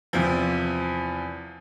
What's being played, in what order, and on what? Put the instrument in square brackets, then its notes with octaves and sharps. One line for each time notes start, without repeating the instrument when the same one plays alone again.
[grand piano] E2 C3 F3